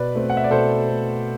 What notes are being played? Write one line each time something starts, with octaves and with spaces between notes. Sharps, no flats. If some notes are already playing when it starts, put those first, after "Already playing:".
Already playing: B2 B4 D5
A3 C4
F#5
E5
D5
B2 A4 C5
A3 C4